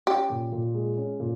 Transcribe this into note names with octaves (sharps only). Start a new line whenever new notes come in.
C#4 G4
A#2
A#2
G#3
C#4
A#2